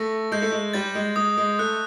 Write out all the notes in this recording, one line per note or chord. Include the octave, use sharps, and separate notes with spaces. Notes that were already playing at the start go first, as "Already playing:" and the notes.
Already playing: A3 A#6
G#3 G6
A3
G#3
G3 A6
G#3
G#3 D#6
G#3
A3 F#6